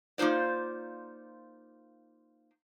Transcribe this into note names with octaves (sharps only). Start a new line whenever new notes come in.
A#3 D#4 F4 C5 D5